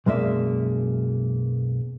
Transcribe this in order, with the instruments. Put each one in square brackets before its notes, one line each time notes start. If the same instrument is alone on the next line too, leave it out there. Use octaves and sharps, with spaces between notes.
[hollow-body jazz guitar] B1 F#2 G#3 A#3 D5 E5